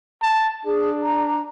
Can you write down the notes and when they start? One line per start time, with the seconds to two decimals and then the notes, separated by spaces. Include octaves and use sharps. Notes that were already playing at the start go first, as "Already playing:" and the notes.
0.22 A5
0.66 D4 G#4
1.02 A#5